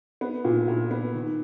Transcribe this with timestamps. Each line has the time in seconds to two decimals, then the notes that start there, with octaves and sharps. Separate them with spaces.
0.21 B3
0.45 A#2
0.68 A#2
0.91 B3
1.14 D#3